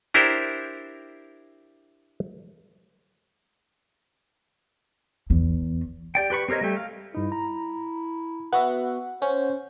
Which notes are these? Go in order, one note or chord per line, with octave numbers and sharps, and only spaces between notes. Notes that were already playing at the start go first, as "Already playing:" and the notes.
D4 E4 G4 A#4 C5
E2
G4 D5 G5
G4 B4 B5 C#6
C4 G4 A#4 C#5 D#5
G3 A3 G4
F5
G2 D#4 E4
A#5
B3 F#4 E5 F#5
C#4 C5